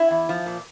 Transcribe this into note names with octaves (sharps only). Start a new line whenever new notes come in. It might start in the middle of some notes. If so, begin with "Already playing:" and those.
Already playing: E4
E2
F3
A#2